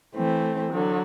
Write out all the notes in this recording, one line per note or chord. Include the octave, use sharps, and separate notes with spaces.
E3 A3 C4
D3 F#3